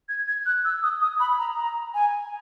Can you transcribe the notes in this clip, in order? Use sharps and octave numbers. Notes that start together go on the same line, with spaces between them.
G#6
G#6
F#6
E6
D#6
D#6
B5
A#5
A#5
G#5